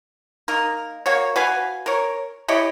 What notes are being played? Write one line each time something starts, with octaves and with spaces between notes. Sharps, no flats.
A#3 D#4 A#4
A#3 F#4 C#5
F#4 B4 F5 G#5
A#4 C#5
E4 G4 C#5 D#5